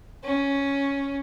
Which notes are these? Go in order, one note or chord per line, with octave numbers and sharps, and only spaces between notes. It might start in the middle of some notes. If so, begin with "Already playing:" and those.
C#4